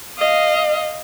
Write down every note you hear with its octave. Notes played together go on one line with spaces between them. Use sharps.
D#5 F5